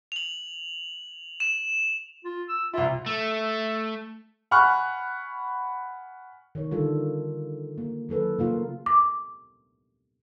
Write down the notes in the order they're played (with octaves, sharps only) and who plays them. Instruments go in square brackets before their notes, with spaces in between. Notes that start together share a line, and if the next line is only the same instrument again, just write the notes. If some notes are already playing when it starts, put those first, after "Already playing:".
[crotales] F7 F#7
E7
[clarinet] F4
E6
[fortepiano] C2 E4 [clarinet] F4
[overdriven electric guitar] A3
[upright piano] F#5 G#5 B5 C#6 F6 F#6
[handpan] D#3 C#5
D3 D#3 G3 F4 A4
A#3
D#3 F#3 A4 B4
C#3 A#3 F4
[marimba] D6